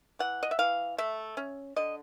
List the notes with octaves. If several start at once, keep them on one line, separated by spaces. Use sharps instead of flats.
E3 F#5
D#5
E5
E3 F5
A3 E5
C#4
D3 D#5